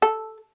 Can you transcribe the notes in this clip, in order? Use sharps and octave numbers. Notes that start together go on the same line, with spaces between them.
A4